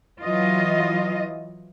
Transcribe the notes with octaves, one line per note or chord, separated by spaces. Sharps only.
E3 F#3 F4 D#5